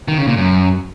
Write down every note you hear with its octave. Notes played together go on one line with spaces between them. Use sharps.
D#3
C#3
A#2
F#2